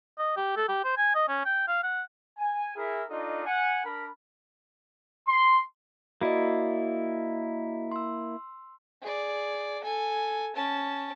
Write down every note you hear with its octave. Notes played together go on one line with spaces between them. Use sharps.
D#5
G4
A4
G4
C5
G#5
D#5
C#4
G5
F5
F#5
G#5
E4 G#4 A#4
D4 D#4 F4 A4 D5 D#5
F#5 G#5
D4 A#4 B5
C6
A#3 E4 F#4 D5 D#5
C6 E6
G#4 D5
A4 G#5
C#4 A5